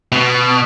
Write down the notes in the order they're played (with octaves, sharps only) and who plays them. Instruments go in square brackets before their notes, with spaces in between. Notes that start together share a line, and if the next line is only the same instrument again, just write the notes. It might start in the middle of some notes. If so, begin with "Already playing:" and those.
[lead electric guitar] B2